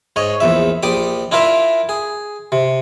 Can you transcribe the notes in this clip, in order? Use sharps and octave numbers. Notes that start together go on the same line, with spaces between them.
G#2 C#5 D#5
A#1 E2 E5
A#1 G4 D5 D#6
D4 E4 F4 A#4 E5
G#4
C3